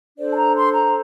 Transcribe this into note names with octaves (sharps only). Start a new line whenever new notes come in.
D4 A4 C5 D5
A5
A#5
C6
A#5